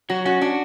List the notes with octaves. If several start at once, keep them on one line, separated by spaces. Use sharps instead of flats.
F#3 F#4
C#4 F#4
D4 F#4